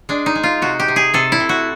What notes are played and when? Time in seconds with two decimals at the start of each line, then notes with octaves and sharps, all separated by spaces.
0.09 G#3 D4
0.26 D#4
0.35 G#3
0.43 F4
0.62 C3 F#4
0.80 G4
0.88 C3
0.96 G#4
1.14 C3 A4
1.32 E4
1.40 C3
1.49 F#4